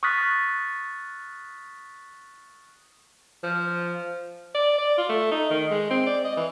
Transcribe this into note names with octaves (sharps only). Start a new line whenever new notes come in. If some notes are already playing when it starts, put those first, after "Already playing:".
C#6 D#6 F6 F#6 A6 B6
F3
D5
D5
F4
A3
D#4
D#3
G#3
C4
D5
D#5
E3